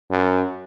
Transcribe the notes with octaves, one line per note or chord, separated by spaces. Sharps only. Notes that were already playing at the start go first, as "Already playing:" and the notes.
F#2